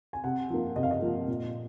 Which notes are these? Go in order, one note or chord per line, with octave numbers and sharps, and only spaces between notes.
G#5
C3 F#5
F3 A#3
C3 D#5
F5
D#5
F3 A#3
A#2